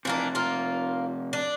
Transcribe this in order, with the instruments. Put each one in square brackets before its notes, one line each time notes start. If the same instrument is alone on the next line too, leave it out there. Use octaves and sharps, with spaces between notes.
[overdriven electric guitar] C3 F3 [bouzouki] E3 A#3 D4
[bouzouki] A#3 F4
D4